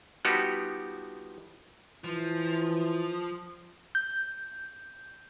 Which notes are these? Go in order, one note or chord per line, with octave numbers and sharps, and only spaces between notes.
F3 G3 B3 D#4 F#4 G4
E3 F3
G6